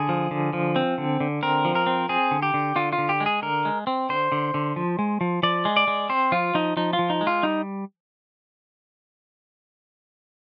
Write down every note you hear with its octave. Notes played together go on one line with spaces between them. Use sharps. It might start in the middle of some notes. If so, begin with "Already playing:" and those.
Already playing: D3 G#4
F3
D3
F3
C4
D3
D3
C4 A#4
F3
A#4
C4
C4 G#4
D3
G4
D3
D3 F4
F4
D3
G4
G#3
G#4
D3 A#4
G#3
C4
D3 C5
D3
D3
F3
G#3
F3
F3 D5
G#3
D5
G#3
C4 C5
F3 F4
F3 D#4
F3 D#4
F4
F3
D#4
G#3
F4
G3 D#4